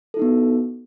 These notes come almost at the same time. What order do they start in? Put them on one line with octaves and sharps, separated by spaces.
A4 E4 D#4 B3 F#4